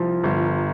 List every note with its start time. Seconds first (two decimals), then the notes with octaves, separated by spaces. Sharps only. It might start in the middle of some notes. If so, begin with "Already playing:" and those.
Already playing: C2 F3
0.24 G1